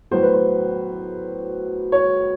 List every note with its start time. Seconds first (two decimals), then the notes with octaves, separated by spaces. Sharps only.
0.11 A2 F#3 B3 C5
0.23 B4
0.34 C5
1.92 C#5